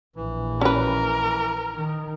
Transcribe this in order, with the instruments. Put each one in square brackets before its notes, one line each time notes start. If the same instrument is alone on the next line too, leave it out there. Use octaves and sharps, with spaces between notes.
[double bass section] A#1 [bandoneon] E3
[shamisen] C#4 B4 [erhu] A#4
[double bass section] D#3